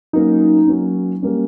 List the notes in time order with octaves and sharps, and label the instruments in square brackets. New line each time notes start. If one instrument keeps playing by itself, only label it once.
[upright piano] F#3 A#3 C#4 [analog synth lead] D#4
[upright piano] F#3 A#3 C#4
G3 A#3 C#4